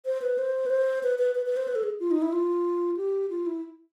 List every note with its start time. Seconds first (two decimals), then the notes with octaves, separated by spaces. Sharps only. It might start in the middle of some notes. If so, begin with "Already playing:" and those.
0.05 C5
0.22 B4
0.38 C5
0.66 B4
0.70 C5
1.03 B4
1.18 B4
1.35 B4
1.46 B4
1.57 C5
1.68 B4
1.75 A4
1.83 G#4
2.00 F4
2.11 D#4
2.22 E4
2.33 F4
2.97 G4
3.30 F4
3.46 E4